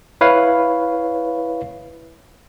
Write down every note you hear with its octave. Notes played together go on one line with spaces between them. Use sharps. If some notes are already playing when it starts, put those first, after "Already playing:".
E4 B4 C#5 F5